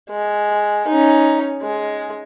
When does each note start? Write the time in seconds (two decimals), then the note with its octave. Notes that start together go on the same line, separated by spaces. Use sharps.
0.10 G#3
0.88 C#4 D#4
1.62 G#3